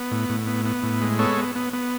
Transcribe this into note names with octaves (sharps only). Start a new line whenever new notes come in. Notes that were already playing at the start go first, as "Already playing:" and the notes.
Already playing: B3
A2
A2
B3
B3
A2
G#3
B3 A4 C#5
B3
B3
B3